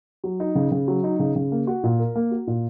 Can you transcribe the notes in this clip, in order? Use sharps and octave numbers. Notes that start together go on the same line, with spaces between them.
F#3
D#4
C#3
C#3
F#3
D#4
C#3
C#3
A#3
F#4
A#2
A#4
A#3
F#4
A#2